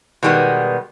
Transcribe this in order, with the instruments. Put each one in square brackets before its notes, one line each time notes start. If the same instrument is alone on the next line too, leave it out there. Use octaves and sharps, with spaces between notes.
[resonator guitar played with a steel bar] B2 D#3 G3 G#3 B3